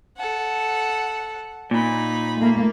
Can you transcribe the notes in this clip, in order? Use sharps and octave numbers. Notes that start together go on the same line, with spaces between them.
A4 F#5
A#2 D#4 B5
A3 A#3